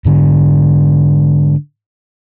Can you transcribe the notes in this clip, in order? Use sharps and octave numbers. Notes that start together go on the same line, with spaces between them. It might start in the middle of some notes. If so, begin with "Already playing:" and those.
G#2 D3